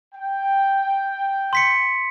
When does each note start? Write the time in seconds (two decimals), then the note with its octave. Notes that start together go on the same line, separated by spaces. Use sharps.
0.14 G5
1.53 C6 B6 C#7